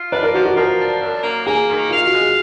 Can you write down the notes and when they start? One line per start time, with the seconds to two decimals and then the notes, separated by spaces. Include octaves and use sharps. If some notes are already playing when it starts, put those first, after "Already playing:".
Already playing: F4
0.12 D4 B4
0.23 A#4
0.34 F3 F#4
0.46 F#4
0.56 F3 A#4
0.80 D4
1.02 F#2
1.23 A#3
1.46 A#3 G#4
1.69 D#3
1.90 F4 F5
2.06 F#4
2.13 G#3
2.21 G#4